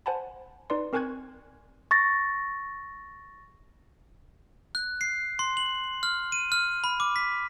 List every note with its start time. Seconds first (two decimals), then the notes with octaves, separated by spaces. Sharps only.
0.06 C5 F#5 G#5 A5 B5
0.70 D#4 B4 D5 C6
0.93 C4 A#4 G#5 C#6 F#6 G#6
1.91 C#6 A6 A#6
4.75 F#6
5.01 C7
5.39 C6
5.57 F#7
6.03 F6
6.32 D#7
6.52 F6
6.84 B5
7.00 D6
7.16 B6